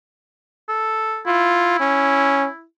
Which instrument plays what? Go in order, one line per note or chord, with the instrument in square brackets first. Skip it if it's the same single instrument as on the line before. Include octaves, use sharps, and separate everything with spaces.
[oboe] A4
[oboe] E4 [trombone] F4
[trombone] C#4